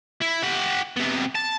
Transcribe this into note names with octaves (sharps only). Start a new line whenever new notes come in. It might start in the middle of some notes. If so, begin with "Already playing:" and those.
E4
G4 F#5
C3 B3
A5